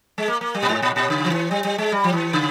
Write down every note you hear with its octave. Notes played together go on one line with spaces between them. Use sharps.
G#3
A#3
A#3
G3
A#2
G#2
A#2
A#2
C#3
F3
E3
G3
G3
G#3
G3
F3
E3
C#3